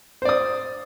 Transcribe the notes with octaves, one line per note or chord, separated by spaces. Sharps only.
C5 D5 D#6